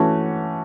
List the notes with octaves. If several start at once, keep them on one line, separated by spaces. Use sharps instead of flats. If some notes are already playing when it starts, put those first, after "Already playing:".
Already playing: E3 A3 C#4 F#4